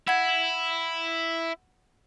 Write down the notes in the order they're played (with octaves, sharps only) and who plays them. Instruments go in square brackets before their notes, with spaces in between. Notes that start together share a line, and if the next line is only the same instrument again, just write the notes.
[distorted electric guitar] E4 [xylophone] F#5 G#6